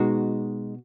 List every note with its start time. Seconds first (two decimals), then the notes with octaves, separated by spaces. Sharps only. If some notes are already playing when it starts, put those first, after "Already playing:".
Already playing: B2 G#3 D#4 F#4